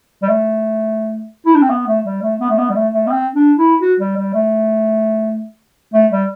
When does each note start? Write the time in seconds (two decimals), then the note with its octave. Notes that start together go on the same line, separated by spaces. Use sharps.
0.22 G3
0.29 A3
1.46 E4
1.55 D4
1.62 C4
1.70 B3
1.87 A3
2.06 G3
2.22 A3
2.40 B3
2.50 A3
2.58 B3
2.70 G3
2.76 A3
2.94 A3
3.07 B3
3.11 C4
3.35 D4
3.58 E4
3.82 F#4
4.00 G3
4.17 G3
4.34 A3
5.94 A3
6.12 G3